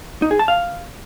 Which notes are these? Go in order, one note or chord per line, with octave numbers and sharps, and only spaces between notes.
D#4
G#4
A5
F5